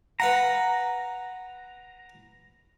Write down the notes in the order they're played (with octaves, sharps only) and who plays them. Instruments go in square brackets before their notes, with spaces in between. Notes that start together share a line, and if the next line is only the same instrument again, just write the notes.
[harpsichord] B4 F5 F#5 [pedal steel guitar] A#5